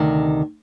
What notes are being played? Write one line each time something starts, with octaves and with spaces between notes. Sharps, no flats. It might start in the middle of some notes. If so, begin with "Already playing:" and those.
Already playing: D2 C3 D#3